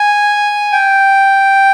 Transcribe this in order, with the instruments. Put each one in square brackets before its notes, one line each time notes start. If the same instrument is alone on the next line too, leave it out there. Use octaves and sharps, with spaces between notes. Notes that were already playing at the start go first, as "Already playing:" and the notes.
Already playing: [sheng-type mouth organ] G#5
G5